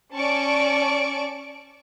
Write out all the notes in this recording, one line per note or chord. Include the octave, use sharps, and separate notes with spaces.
C#4 D5 A5 C#6 D7